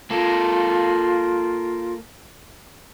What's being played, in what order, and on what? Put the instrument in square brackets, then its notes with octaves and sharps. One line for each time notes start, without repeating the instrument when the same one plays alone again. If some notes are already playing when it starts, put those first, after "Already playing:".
[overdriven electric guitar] A#3 A4 [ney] F4